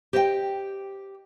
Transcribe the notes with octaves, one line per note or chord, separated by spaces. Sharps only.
G4 C5 D#5 E5 G5